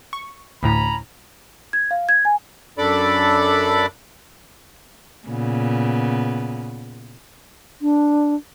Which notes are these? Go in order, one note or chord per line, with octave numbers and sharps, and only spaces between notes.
C#6
D2 A2 C#4 A#5 B5
G#6
F5
G#6
G#5
F#2 D4 A4 D5 B5 D6
A#2 C#3 B3
D4